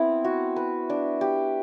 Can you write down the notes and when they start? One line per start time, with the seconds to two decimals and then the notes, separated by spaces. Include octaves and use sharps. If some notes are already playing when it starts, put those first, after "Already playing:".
Already playing: B3 C4 E4
0.24 F#4
0.56 B4
0.90 D4
1.21 G4